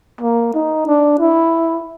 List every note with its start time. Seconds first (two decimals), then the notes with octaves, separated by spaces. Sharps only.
0.21 A#3
0.54 D#4
0.87 D4
1.19 E4